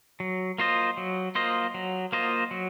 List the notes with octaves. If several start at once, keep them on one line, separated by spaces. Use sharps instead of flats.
F#3
A#3 F4 C5 D#5
F#3
A#3 F4 C5 D#5
F#3
A#3 F4 C5 D#5
F#3